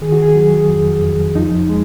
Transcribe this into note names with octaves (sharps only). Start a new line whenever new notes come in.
D#3 G#4
F#4
G#4
F#3
F2
F2
F3 D#4
G#3